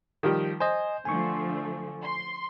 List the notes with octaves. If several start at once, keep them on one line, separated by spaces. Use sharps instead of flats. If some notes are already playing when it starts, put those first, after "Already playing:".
D#3 F3 G3
C5 D#5 G#5
D3 F3 A3 G#5 C#6
C6